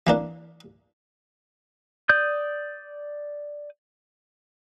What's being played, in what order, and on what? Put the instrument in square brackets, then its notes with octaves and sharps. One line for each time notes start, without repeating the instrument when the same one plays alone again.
[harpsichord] E3 A#3 D4
[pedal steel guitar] D5 D#6 G6